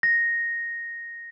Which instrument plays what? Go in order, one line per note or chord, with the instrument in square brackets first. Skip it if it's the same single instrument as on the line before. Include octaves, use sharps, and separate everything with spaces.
[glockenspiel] A#6